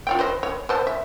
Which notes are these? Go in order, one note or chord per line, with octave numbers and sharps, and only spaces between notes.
F4 C#5 G5
B4 C5 D#5
C#5
B4 C5 A5
E5